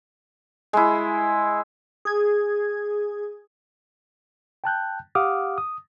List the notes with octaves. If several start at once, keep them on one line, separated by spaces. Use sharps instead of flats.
G#3 E4
G#4 G#6
G5 A5 F#6 G6
G4 F5 F#5 D6 D#6 F6
D#6